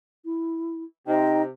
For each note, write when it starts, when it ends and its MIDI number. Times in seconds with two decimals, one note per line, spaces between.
0.25 0.84 64
1.07 1.49 48
1.07 1.42 63
1.07 1.41 72
1.07 1.41 75
1.07 1.41 79